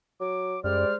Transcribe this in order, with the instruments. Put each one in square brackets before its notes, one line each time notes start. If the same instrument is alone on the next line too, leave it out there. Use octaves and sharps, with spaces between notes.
[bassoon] F#3 [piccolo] D6
[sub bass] F#2 [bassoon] G3 [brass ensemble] G#3 C5 D5 [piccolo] F6